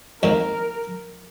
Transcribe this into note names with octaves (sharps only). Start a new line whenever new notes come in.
F2 D#3 A#3 A#4